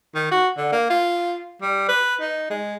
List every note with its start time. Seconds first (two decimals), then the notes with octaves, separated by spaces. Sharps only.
0.15 D#3
0.32 F#4
0.57 D3
0.72 A#3
0.90 F4
1.62 G3
1.89 B4
2.21 D#4
2.50 G#3